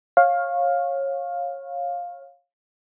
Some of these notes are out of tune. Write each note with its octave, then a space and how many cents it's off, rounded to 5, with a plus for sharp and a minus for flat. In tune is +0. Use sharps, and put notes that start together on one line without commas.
C#5 -20 F5 +10